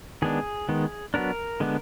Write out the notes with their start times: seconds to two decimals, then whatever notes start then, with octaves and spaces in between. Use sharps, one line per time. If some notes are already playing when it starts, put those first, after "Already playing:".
0.22 D#3 G#3 B3 D4 G#4
0.69 D#3 G#3 B3
1.14 F#3 B3 D4 A#4
1.60 D3 G#3 B3 D4